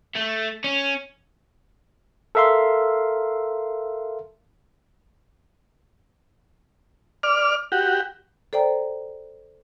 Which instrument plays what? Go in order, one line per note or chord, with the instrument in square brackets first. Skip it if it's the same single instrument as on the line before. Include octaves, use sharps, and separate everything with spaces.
[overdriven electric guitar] A3
C#4
[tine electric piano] A4 A#4 E5 F5 C6
[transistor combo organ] D5 F6
F#4 G4
[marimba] A4 C5 D5 G5 A#5